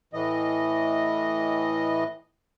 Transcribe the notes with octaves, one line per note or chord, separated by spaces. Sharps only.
A2 E3 D#5